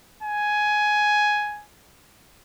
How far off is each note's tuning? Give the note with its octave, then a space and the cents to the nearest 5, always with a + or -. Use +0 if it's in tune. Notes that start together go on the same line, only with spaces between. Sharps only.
G#5 +10